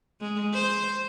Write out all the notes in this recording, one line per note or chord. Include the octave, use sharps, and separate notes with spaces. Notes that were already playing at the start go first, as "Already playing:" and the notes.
G#3
C5